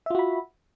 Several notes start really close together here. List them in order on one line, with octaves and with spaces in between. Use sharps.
E5 F4 F#4 B5